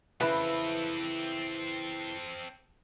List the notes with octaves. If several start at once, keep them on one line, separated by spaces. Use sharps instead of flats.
C#3 E3 C4 E4 A4 B4